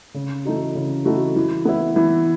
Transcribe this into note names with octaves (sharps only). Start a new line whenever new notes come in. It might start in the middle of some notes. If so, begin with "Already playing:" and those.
C#3
E3 A3 D#4 F#4
C#3
E3 A3 D#4 F#4
E3
B3 E4
E3